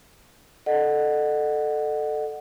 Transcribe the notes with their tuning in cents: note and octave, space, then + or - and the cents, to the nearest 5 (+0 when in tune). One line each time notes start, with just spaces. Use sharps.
A4 +0 D#5 -45 F#5 +0